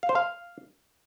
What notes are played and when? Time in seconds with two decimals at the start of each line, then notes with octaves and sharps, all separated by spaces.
0.03 F5
0.09 C5
0.15 F5